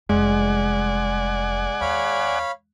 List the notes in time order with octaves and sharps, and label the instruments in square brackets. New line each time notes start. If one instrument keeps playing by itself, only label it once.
[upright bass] F1 G3 [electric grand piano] G#3 [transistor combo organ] D5 F#5 G#5
[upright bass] D#2 [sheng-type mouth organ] C#5 F5 B5